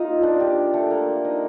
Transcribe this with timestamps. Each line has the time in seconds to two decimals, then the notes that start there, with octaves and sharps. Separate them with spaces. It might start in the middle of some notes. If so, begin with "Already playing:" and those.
Already playing: A#3 D#4 F4 D#5 F5
0.22 D4 D5
0.40 G4
0.74 A3 A4
0.91 A#3 A#4
1.25 D#4 D#5